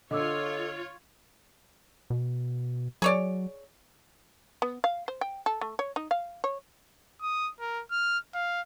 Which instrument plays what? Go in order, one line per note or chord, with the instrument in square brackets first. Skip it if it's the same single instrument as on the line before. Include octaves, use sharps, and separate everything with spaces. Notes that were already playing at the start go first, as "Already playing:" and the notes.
[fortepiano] D3 [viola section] F4 C#5 [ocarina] A4 [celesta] D#5 D6 E6
[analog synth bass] B2
[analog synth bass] F#3 [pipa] G#4 C#5 D5
[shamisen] B3
F5
C5
G5
A4
A3
C#5
D#4
F5
C#5
[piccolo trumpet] D#6
A#4
F6
F5